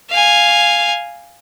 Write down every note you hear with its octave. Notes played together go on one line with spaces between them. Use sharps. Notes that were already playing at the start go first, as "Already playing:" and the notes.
F5 G#5